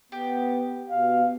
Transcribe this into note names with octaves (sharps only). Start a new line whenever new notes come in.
B3 G4
B2 F5